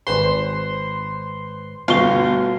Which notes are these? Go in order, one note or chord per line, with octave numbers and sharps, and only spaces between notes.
G#1 B4 C5 C6
G1 D2 B2 F5 C#6 G7